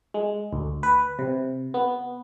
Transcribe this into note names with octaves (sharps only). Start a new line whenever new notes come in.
G#3
D2
B4
C3
B3